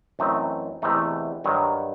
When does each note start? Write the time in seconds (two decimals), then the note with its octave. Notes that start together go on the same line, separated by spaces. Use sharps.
0.19 F#2 E3 A3 C4 D#4
0.82 E2 C3 E3 A3 D#4
1.44 G2 D#3 F#3